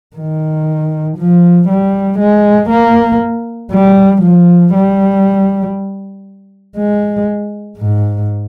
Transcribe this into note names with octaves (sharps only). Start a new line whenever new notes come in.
D#3
F3
G3
G#3
A#3
G3
F3
G3
G#3
G#2